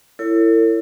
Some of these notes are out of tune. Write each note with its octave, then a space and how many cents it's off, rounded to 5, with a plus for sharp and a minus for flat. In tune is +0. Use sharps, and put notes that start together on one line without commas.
E4 +15 A4 +45 C#5 +10